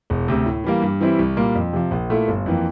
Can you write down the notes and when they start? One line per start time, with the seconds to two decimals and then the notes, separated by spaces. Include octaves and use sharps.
0.10 E1
0.28 D2 C3
0.46 A2
0.64 E3 G3 A#3
0.82 G2
1.01 E3 G3 C4 E4
1.19 C2
1.37 A#2 G3 A#3
1.55 F2
1.73 C3 F3
1.91 A#1
2.10 A#2 A3 E4 A4
2.28 G1
2.46 F2 E3 A#3